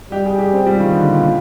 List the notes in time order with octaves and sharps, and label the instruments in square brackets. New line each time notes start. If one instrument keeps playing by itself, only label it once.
[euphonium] G3 [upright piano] G4
[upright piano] G#4
G4
C4
[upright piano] G3 [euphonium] F4
[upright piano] D#3
D3
A#2
A#2